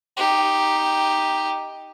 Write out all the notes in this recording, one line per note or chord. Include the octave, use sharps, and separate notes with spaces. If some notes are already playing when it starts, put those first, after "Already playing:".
D#4 G4